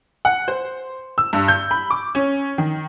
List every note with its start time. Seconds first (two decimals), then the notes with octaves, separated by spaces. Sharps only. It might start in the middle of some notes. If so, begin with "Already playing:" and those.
0.25 F#5
0.48 C5
1.18 E6
1.33 G2
1.48 G6
1.71 B5
1.91 D6
2.15 C#4
2.58 D#3